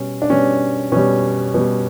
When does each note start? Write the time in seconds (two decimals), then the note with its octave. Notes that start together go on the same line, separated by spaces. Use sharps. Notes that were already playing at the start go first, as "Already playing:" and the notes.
Already playing: B2 G3 C#4
0.22 D4
0.30 B2 G3 C#4
0.92 B2 G3 C#4
1.54 B2 G3